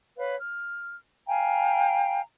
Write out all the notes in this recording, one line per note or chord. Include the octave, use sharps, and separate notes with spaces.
B4 C#5 F5
F6
F5 G5 G#5 A#5